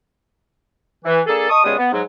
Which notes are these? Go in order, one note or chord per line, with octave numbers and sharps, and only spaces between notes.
E3
A#3 D4 G#4 A4
D#5 A5 C#6 D#6
C#2 C#3 G3 G#3 B3 D#6
B3
G#2 F#3